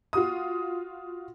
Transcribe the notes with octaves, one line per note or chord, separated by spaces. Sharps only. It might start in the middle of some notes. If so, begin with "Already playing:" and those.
F4 F#4 D#6